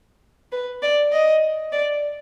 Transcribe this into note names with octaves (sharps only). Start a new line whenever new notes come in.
B4
D5
D#5
D5